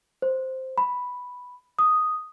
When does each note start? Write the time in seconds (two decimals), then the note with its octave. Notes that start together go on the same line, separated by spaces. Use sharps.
0.22 C5
0.78 B5
1.79 D#6